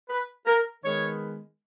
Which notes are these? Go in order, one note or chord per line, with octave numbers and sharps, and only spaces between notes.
B4
A#4
D#3 G#3 B3 C#5